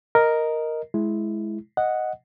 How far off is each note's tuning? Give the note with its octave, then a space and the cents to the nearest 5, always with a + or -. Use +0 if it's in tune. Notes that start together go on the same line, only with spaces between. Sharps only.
A#4 +0 D#5 +0
G#3 +20 E4 +0
D#5 +0 F#5 +0